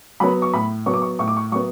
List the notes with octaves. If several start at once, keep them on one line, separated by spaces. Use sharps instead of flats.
F#3 B3 B5
C#6
A2 B5
F#3 B3 C#6
D6
C#6
A2 C#6
D6
C#6
F#3 B3 C#6